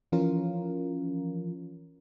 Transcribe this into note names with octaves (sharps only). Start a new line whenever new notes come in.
E3 F3 C#4 F4 A#4